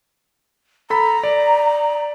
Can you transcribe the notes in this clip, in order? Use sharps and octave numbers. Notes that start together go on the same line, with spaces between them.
A4 A#5 B5 B6
D5